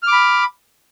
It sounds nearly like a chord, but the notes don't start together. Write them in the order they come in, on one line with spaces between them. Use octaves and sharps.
F6 D6 B5